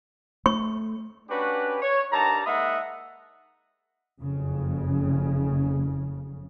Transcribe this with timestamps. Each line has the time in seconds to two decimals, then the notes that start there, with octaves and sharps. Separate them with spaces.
0.46 A3 C#6
1.29 C#4 D4 F#4 G4 B4
1.81 C#5
2.12 G2 D#3 G3 A5 A#5
2.46 G#2 A#3 D#5 E5 F#5 B5
4.21 F#1 F2 C#3